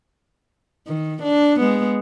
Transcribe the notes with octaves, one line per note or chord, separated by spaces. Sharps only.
D#3
D4
G#3 B3